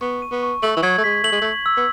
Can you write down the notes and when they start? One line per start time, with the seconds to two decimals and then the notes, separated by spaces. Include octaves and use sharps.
0.01 B3 C#6
0.22 D#7
0.32 B3
0.43 C#6
0.63 A3 F#7
0.77 E3
0.83 F#3 G#6
0.98 A3
1.04 G#3 B6
1.24 A3 F#7
1.32 G#3
1.41 A3 F#7
1.66 E6
1.77 B3